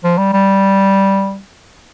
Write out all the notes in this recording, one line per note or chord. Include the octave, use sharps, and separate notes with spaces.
F3
G3
G3